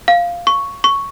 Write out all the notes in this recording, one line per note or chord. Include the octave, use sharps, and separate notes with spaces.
F5
C#6
C#6